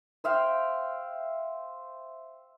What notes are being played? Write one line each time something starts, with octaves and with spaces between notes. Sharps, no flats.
C5 E5 F5 G5